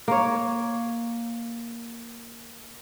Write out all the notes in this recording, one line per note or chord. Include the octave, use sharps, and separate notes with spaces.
A#3 C#5